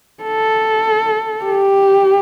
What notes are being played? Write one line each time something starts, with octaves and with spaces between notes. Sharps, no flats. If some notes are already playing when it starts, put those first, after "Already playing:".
A4
G4